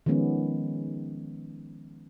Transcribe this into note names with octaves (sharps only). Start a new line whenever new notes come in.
D#3 F3 G#3 B3 C#4